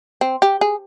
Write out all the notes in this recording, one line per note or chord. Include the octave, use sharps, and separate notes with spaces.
C4
G4
G#4